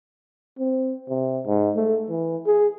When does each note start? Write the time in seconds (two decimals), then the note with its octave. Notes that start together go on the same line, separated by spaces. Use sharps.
0.59 C4
1.09 C3
1.46 G#2
1.76 A3
2.09 E3
2.46 G#4